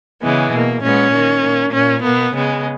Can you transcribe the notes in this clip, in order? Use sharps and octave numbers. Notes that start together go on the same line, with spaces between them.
C#3 E3 G#3 B3
B2 A#3
A#2 G#3 B3 C#4
D#3 A#3
A#2 A#3
A#2 A#3 C#4
B2 A#3 B3
C#3 G#3 B3